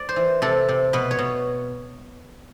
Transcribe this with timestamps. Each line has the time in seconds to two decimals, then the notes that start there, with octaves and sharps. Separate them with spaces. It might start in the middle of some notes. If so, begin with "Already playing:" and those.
Already playing: D5
0.09 C5
0.16 E3
0.42 C3 A4
0.69 C3
0.93 B2 B4
1.11 C#5
1.19 B2